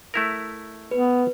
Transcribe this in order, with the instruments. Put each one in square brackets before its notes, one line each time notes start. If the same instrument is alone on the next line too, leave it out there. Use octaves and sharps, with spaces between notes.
[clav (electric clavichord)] A3 E4 A#4
[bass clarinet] B3 [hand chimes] B4